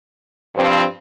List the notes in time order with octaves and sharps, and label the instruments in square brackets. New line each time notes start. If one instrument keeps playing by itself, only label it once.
[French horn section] G2 F3 C4